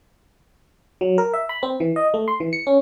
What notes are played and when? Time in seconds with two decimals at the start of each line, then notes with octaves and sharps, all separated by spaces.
1.01 F#3
1.18 A#4
1.34 E5
1.49 B5
1.63 C4
1.80 E3
1.96 D#5
2.14 A3
2.28 C6
2.40 E3
2.53 C#7
2.67 C#4